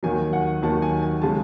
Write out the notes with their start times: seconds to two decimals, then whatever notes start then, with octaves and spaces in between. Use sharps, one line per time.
0.03 D#2 D#3 F#3 G#5
0.33 F#5
0.62 D#2 D#3 F#3 A5
0.82 G#5
1.02 G#5
1.22 C#3 G#3 A5